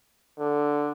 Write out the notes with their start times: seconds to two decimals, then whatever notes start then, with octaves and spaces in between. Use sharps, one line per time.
0.39 D3